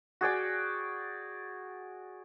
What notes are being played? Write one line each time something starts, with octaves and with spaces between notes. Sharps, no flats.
F#4 G#4 D5 G5